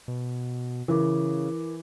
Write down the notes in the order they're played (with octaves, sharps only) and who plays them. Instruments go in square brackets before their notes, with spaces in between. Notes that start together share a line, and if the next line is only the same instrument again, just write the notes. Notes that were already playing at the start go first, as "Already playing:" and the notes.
[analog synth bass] B2
[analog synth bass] C#3 [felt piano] E3 [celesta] E4 A#4 D6